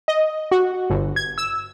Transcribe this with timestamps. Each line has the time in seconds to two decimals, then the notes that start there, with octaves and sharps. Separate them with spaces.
0.08 D#5
0.51 F#4
0.90 G1
1.16 G#6
1.38 E6